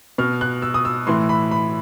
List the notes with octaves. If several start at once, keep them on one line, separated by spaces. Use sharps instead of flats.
B2 F6
F#6
E6
D#6
E6
A2 E3 C6
B5
B5